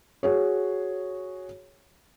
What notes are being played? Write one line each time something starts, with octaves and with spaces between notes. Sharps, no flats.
F#4 G#4 C#5